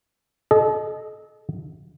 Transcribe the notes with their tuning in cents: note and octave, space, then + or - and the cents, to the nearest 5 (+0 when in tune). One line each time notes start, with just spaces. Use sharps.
A4 -35 D#5 -10